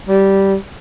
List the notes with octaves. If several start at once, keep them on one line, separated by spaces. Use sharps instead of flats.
G3